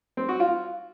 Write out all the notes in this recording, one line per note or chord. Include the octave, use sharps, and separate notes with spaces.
C4
F#4
F4